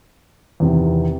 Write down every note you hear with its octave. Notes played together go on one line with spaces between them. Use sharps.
E2 C3 D#3